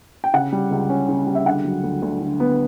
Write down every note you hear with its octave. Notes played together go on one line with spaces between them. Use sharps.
G5
C#3 F#5
G3
C#2
C#4
C#3
G3
E5
D3 F#5
F#3
D2
D2
D3
B3